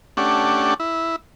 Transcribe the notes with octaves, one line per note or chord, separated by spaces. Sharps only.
A3 C#4 D4 G4 F#5
E4